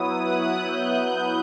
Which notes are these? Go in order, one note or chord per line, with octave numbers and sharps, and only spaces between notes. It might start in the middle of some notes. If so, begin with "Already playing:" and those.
Already playing: F#3 B3 E4 D#6
F#6
G6